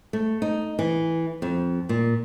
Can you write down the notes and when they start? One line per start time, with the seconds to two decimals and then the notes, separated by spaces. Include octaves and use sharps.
0.13 A3
0.42 D#4
0.79 E3
1.42 F2
1.89 A#2